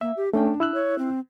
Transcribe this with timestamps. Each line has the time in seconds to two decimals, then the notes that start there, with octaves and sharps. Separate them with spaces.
0.01 A#3 E5
0.17 G4
0.33 A3 C#4 D4 G5
0.60 E4 E6 F#6
0.74 C#5
0.99 C4